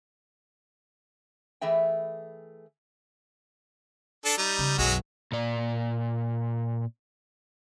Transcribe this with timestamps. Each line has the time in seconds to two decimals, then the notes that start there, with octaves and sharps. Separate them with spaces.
1.61 E3 A3 G#4 E5 G5
4.25 D4 A4
4.38 G3 D#4
4.59 C#3
4.78 B1 F#2 F#3 G#3 F#4
5.32 A#2 D5